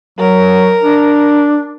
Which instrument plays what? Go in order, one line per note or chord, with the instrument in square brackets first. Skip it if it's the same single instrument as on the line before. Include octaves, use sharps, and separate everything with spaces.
[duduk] F#3 [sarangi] A#4
[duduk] D4